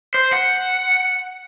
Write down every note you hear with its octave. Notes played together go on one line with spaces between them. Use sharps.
C5
F#5